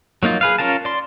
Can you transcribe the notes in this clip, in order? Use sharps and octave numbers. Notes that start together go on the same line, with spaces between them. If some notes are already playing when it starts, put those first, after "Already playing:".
F#3 A#3 D#4 F4
G#4 B4 F5
C#4 F4 A#4 F5 A5
D5 C6